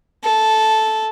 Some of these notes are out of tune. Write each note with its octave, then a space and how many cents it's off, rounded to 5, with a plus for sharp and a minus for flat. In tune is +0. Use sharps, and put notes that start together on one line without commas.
A4 -5